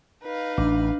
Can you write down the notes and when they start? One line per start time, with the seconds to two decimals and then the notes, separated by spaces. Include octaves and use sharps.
0.24 D#4 B4 F5
0.58 A1 D4